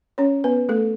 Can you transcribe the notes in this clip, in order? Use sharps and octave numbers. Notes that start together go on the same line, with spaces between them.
C#4 C#5
B3 B4
A3 A4